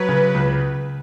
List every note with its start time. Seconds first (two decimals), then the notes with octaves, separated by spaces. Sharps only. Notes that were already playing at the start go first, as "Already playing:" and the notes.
Already playing: F#3 B4
0.09 C#3
0.34 C#2